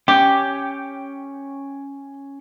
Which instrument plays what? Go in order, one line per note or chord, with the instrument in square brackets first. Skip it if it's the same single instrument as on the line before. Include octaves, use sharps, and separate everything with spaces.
[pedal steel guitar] C#4 G5 D6 [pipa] G4